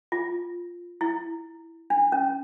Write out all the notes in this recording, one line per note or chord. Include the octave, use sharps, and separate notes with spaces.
F4
E4
D4
C#4